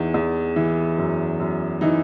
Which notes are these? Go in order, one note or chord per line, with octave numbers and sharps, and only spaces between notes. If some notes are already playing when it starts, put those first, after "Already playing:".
Already playing: E2 E3 D#4
E2
E3
F#2
F#2
E3 D#4